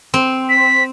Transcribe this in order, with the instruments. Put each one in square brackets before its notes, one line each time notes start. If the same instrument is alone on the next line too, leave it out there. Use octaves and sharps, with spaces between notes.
[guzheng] C4
[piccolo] B6